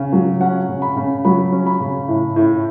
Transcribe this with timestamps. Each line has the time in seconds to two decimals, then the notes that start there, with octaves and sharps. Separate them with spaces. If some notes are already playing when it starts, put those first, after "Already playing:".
Already playing: C#3
0.13 F#3
0.41 C#4 F#5
0.68 C#3
0.82 B5
0.96 C#3
1.25 F#3 B5
1.52 C#4
1.66 B5
1.80 C#3
2.08 A2
2.36 A2